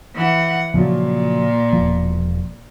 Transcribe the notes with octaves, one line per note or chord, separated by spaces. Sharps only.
E3 F#5
A#2 C#3 F3 F#3
E1 F3